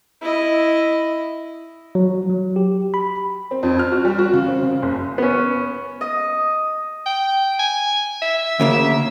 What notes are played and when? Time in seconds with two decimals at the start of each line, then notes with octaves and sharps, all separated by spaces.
0.22 E4 D#5
1.95 F#3
2.30 F#3
2.56 G4
2.94 B5
3.51 C4
3.63 F2
3.79 F6
3.92 F#4
4.05 G3
4.18 F#4
4.33 C#3
4.48 C4
4.62 C#3
4.82 F#1
5.18 B3 C#4
6.01 D#5
7.06 G5
7.59 G#5
8.22 E5
8.60 D2 C#3 A#3